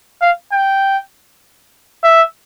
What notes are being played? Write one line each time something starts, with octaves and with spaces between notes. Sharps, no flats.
F5
G5
E5